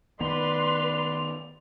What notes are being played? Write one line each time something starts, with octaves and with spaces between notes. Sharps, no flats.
D#3 B3 B4 D5 C6 F7